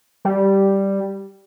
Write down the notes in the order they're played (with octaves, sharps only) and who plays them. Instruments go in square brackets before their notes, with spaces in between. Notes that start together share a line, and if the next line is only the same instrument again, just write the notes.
[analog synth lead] G3